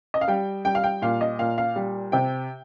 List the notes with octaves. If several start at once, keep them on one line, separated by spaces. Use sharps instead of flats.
D#5
F5
G3 G5
G3 G5
F5
G5
A#2 F5
D#5
A#2 F5
F5
G3
C3 G5